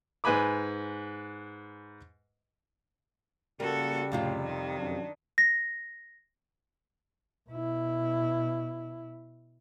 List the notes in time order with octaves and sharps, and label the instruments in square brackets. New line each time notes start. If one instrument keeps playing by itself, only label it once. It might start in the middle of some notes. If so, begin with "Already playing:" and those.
[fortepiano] G#2 B4 G#5 B5 D6
[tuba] C#3 [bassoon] G3 [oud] A#3 [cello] F#4 A4
[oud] F2 C3 F4 [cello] A2
[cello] D#3
[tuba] F#2 [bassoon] D4
[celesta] A#6
[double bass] B2 E4